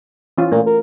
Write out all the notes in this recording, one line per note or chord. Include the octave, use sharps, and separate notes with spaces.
E3 C#4 F4
A#2 A3
A#4